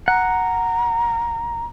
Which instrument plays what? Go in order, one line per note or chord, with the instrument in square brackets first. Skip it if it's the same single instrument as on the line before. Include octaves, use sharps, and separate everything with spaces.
[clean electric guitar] F#5 [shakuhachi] A#5